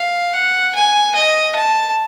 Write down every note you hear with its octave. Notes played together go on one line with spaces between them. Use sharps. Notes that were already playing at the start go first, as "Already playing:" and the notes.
Already playing: F5
F#5
G#5
D#5
A5